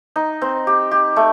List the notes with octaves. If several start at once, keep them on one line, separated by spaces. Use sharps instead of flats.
D#4
C4
G4
G4
A3